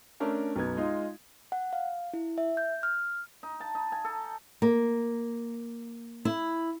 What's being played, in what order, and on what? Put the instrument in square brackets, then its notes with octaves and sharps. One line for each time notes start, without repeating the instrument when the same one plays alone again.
[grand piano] A3 C#4 D4 A#4
B1 F#2 B3 G#6
G#3 D#4 F4
[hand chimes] F#5
F5
E4
E5
G6
F6
[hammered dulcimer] D#4
A5
D#4
G#5
A4
[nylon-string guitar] A#3
E4